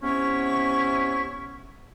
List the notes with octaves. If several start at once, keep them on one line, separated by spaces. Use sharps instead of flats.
C3 B3 C#4 E4 C#5 C#6